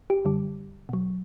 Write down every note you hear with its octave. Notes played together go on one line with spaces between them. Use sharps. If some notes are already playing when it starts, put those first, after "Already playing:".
G4
F#2 D3 G3
B2 F#3